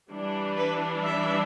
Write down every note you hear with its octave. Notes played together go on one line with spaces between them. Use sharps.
E3 G3 D4
B4
E5